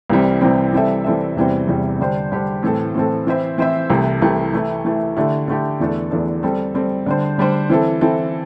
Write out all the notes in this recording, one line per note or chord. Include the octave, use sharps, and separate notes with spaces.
C2 C3 E3 G3 C4
C2 C3 E3 G3 C4
E3 G3 C4 A4 E5
E3 G3 C4 A4 E5
E2 C3 E3 G3 C4
E2 C3 E3 G3 C4
D3 G3 D4 G4 C5
D3 G3 D4 G4 C5
A2 E3 C4 A4
A2 E3 C4 A4
E3 C4 E4 C5 E5
E3 C4 E4 C5 E5
C2 C3 E3 A3
C2 C3 E3 A3
E3 A3 E4
E3 A3 E4
D3 A3 E4 G4
D3 A3 E4 G4
E2 E3 A3 D4 A4
E2 E3 A3 D4 A4
G3 C4 A4
G3 C4 A4
D3 G3 D4 C5
D3 G3 D4 C5
E3 C4 E4 A4
E3 C4 E4 A4